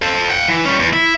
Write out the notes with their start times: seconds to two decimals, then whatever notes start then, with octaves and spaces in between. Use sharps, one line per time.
0.02 A4 C5
0.29 F#5 G5
0.48 E3
0.65 G3 C#4
0.79 E2
0.93 E4